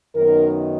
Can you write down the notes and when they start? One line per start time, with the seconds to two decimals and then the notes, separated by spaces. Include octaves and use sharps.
0.15 F#2 D#3 F#3 B3 D#4 A#4